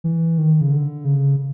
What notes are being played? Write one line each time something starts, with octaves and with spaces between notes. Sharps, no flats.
E3
D#3
C#3
D3
C#3